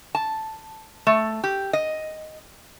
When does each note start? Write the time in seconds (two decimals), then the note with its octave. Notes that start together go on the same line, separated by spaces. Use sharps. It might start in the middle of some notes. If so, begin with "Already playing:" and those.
0.15 A5
1.07 A3
1.44 G4
1.73 D#5